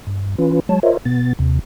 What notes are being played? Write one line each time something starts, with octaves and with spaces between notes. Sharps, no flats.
G2
E3 C#4 F4 B4
F#3 G#3 C#5 A5
F4 A#4 C5 C#5 D#5 E5
B2 B3 A6
D#2 C3